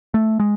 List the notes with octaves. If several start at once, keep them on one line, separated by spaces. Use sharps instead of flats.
A3
G#3